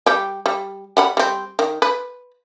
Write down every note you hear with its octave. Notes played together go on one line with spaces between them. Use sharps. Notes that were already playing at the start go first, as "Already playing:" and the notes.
G3 G4
G3
G3 F#5 B5
G3 C4
D#3
B4